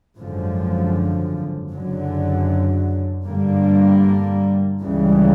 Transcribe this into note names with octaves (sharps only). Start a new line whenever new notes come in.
G#1 F#2 D3 F3
F#1 F#2 D3 F#3
G2 D3 G3 A#3
C#2 C#3 E3 G3